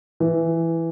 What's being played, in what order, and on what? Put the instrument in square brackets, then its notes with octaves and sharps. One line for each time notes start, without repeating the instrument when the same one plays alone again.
[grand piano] E3